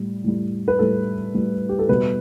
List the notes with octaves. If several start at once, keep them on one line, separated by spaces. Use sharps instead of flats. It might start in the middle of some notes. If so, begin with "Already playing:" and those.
Already playing: A2 G3
A2 G3
B4
A2 G3 A4
A2 G3
G4
A4
B2 G3 B4